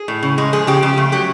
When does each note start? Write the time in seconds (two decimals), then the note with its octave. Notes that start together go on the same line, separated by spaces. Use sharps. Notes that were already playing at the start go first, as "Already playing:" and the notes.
Already playing: G#4
0.08 A2
0.23 C#3
0.38 G#3
0.53 F3 G#4
0.67 C#3 G4
0.82 C#3 G4
0.97 A3
1.12 F#3 G4